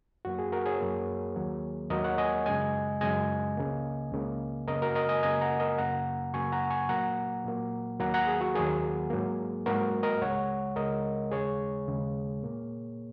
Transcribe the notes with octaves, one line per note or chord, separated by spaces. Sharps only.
F#2 F#3 A#3 F#4
G#4
F#4 A#4
G#4 C#5
F#2 F#3 A#3
D#2 D#3 F#3 A#3
D#2 D#3 F#3 A#3 A#4 D#5
C#5 F#5
D#5 G#5
F#2 C#3 G#3 D#5 G#5
F#2 C#3 G#3 D#5 G#5
C#2 C#3 A#3
C#2 C#3 A#3
F#2 C#3 A#3 A#4 D#5
F#4 A#4
A#4 D#5
D#5 G#5
A#5
F#2 C#3 A#3 D#5 G#5
F#5 A#5
A#4 D#5
F#2 C#3 F#3 A#3 F#5 A#5
F#2 C#3 F#3 A#3 G#5 C#6
F#5 A#5
G#5 C#6
A#2 F#3 A#3 F#5 A#5
A#2 F#3 A#3
D#2 D#3 F#3 A#3 F#5 A#5
F#5 A#5
G#4
F#4
D#2 D#3 F#3 A#3 G#4
G#2 F#3 A#3
G#2 F#3 A#3 F#4 A#4
A#4 D#5
C#2 C#3 G#3 C#5 F#5
C#2 C#3 G#3 A#4 D#5
D#2 C#3 G#3 G#4 C#5
D#2 C#3 G#3
A#2 A#3